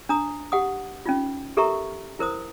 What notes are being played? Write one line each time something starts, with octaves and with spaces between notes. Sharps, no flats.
D4 A#5 D#6
G4 F#5 D#6
C#4 D#4 F4
G4 A4 A#4 E5 A#5 C#6
E4 A#4 C5 D#6